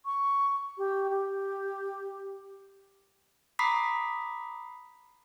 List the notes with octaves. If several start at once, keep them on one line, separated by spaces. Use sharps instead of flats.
C#6
G4
G4
A#5 B5 D6 D#6 B6 C7